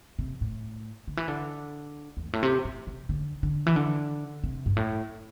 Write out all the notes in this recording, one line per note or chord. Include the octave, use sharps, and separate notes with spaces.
C3
A2
D3
E3
D3
E2
G2
A2
C3
A2
C3
D3
D3
E3
D3
C3
G2
A2